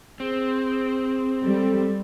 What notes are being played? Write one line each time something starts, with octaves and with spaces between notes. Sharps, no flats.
C4 G#4
G3 A4